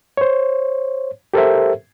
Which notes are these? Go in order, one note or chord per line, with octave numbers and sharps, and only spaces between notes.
C5 C#5
G4 A4 A#4 C5 E5